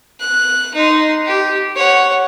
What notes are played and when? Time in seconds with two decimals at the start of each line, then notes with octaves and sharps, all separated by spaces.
0.20 F#6
0.74 D#4 C6
1.25 G4
1.76 C#5 F#5